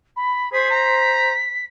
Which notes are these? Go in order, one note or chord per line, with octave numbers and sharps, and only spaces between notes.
B5
G#4 C5 B6
A#5